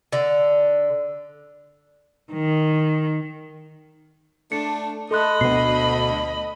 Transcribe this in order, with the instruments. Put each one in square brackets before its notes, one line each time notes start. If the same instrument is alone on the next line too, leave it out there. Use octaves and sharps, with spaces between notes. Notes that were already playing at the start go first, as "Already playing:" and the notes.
[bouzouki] D3
[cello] D#3
[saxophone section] A3 D4 [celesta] C#7
[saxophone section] A3 [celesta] A4 C6 F#6 [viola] D#5 B5
[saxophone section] D2 [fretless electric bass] B2 B3 [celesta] C7